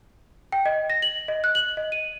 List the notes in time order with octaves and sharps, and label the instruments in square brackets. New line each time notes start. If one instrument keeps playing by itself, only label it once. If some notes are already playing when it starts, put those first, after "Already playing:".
[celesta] G5
D#5
A#6
F#7
D#5
F#6
F#7
D#5
D#7